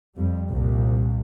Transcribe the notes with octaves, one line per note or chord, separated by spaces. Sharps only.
F2 G3
C2 A#2